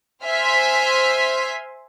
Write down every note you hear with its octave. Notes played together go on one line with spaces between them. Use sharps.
C5 E5 G#5 C6 F6 B6